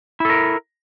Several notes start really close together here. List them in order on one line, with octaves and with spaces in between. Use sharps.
E4 A4 A#4